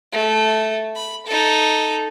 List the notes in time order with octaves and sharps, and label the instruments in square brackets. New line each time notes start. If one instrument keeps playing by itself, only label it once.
[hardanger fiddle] A3
B5
D#4 A4